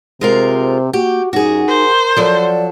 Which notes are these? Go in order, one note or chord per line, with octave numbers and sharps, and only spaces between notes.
C3 G#3 F4 A#4 C5
A#3 F#4 G4
F#2 D#4 F#4 G#4
A#4 C5
F3 F#3 A4 D5